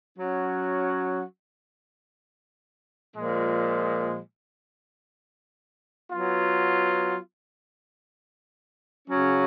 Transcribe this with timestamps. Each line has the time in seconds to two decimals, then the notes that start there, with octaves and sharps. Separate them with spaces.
0.18 F#3 C#4 F#4
3.15 A#2 F3 G#3
6.11 F#3 B3 F4
9.08 C#3 F#3 C#4